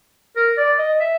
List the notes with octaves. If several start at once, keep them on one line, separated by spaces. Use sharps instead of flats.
A#4
D5
D#5
E5